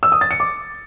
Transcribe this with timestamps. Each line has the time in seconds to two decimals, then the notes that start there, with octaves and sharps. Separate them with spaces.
0.03 E6
0.12 D#6
0.21 A6
0.31 C#7
0.40 D6